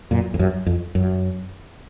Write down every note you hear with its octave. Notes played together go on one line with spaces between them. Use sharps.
F#2 A#2
F2
F#2
F2
F#2